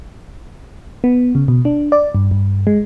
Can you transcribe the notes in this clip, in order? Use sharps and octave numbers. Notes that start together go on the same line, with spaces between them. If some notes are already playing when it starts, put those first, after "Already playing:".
B3
C#3
B2
D4
D5
G2
G2
G#3